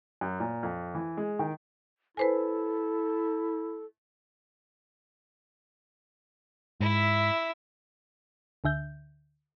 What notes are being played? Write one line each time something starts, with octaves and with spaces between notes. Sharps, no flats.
F#2
A#2
F2
E3
G#3
D#3
E4 A4 B4 C5 G#5
G#2 E4 E5
D2 D3 E5 G6